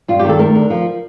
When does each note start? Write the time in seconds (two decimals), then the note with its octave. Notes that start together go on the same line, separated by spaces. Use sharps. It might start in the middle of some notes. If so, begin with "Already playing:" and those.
0.08 G2 F4
0.19 G4
0.24 D#3 A4
0.39 A3 A#4
0.55 D3
0.70 F3